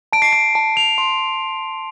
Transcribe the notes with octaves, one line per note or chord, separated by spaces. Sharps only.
A5 D7
C7
A5 D7
A5
A5 F7
C6